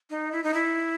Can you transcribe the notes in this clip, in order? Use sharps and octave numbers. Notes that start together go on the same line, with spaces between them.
D#4
E4
D#4
E4